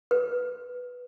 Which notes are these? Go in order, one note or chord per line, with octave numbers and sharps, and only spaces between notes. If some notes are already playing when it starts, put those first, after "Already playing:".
B4